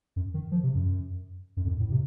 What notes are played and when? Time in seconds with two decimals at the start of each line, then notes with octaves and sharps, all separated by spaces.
0.16 F#2
0.34 D#3
0.51 F3
0.63 C3
0.75 F#2
1.57 F#2
1.64 F2
1.68 F#2
1.80 A2
1.91 C3